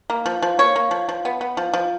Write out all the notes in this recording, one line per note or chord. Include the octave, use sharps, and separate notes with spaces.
A#3
F3
F3
A#3 C#5
A#3
F3
F3
B3
B3
F3
F3